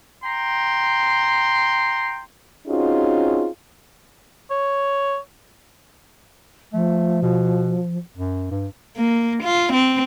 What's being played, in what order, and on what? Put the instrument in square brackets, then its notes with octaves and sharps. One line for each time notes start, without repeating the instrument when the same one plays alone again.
[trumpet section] G5 A#5 C6
[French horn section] C4 C#4 D#4 F4 F#4 G#4
[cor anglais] C#5
[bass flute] F3 [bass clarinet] A3
[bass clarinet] B2
F#2
G2
[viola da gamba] A#3
F4
C4